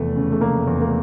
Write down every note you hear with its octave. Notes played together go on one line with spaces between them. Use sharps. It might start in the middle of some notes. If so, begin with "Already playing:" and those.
Already playing: F1 E2 A3
C#3
A3
F1 A#3
E2
A#3